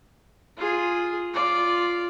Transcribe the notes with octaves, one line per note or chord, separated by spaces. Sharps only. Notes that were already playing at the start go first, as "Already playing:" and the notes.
F4 G#4
F4 D5